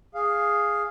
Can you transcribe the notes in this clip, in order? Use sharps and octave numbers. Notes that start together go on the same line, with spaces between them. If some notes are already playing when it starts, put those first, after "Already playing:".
G#4 F5